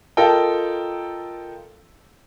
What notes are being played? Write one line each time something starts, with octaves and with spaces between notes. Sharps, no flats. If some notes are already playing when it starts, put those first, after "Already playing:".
F4 A4 A#4 D#5 G5